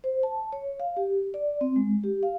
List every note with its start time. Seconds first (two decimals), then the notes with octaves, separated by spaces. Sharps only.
0.04 C5
0.23 A5
0.52 C#5
0.80 F5
0.97 G4
1.34 D5
1.61 C4
1.76 G#3
2.04 G4
2.23 F5